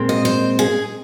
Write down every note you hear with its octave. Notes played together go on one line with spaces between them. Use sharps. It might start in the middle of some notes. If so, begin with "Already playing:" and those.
Already playing: A#2 G#3 C4
D#5
C5
G#4